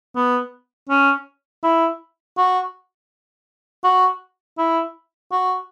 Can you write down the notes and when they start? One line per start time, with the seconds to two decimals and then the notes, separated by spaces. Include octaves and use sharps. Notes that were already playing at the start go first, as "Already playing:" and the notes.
0.15 B3
0.89 C#4
1.63 E4
2.37 F#4
3.84 F#4
4.58 E4
5.32 F#4